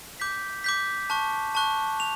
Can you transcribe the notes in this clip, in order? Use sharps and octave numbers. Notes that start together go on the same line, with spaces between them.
D6 G6 B6
D6 G6 B6
A5 C#6 F#6
A5 C#6 F#6
F7